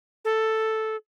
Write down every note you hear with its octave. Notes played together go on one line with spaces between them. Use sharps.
A4